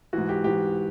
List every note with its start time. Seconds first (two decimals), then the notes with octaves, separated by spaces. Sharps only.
0.13 G#2 E3 F#4
0.29 G4
0.44 G#2 E3 G4